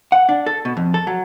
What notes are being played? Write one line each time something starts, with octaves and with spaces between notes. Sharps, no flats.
F#5
D4
A4
B2
F2
A4
F#3